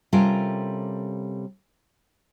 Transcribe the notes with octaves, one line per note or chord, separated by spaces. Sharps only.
C3 G3 C#4 F4 A4 A#4